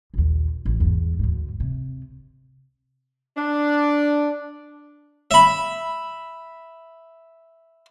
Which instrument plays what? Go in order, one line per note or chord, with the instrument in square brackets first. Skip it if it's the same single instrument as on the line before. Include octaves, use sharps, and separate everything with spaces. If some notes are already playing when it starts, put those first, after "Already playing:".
[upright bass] A#1 D#2
A1
E2 G#2
D2 G#2
C3
[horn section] D4
[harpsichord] E5 B5